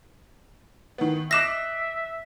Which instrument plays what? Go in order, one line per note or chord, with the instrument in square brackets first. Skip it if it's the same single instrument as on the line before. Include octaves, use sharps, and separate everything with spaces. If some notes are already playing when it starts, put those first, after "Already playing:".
[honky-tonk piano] D#3 B3
[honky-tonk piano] D#5 [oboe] E5 [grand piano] D6 F#6 C7 [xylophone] A#6 E7